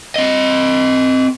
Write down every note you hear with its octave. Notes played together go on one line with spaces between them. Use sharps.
C4 D#5